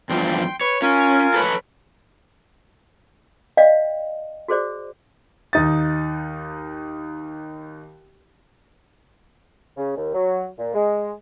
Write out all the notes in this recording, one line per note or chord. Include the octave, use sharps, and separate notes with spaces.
E2 G2 F3 G5 C6
B4 C#5
C#4 F4 A#4 G#5
A4 B4 C#5
D5 D#5 F5 G5
F#4 G#4 C5 D5
D#2 D#4 A6
C#3
D#2
F#3
A#2
G#3